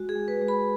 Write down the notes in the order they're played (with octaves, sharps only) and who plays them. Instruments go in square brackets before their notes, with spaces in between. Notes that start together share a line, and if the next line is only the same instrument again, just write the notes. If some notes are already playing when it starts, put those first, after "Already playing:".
Already playing: [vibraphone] G#3 F#4
G#4
G#3
B4
G#3
B5